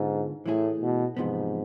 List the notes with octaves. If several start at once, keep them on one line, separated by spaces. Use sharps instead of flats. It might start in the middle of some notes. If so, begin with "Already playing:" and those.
Already playing: G#2 D3 G#3 B3 F4 A4
A2 E3 A3 E4 G#4
B2
E2 G#2 C3 F3 B3